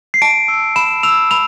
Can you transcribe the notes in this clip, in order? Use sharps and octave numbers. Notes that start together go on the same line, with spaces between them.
C7
A5 D7
E6
B5 E7
E6 F7
B5 F7